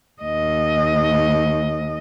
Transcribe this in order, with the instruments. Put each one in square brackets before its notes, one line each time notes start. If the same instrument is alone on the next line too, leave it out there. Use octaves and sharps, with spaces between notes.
[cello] D#2 D#5